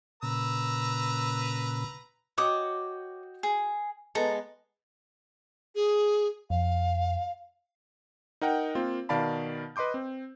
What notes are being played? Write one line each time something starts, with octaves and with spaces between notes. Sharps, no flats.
A#2 C#3 B4 A#5 E6
F#4 C#5 D#5 G5 D6 D#6
G#4
G#3 B3 A4 A#5
G#4
F2 F5
D#4 A#4 F#5 G5
A#3 C4 F4
B2 D#3 D5 F5 A5 B5
B4 D#5 C6 D6 G6
C4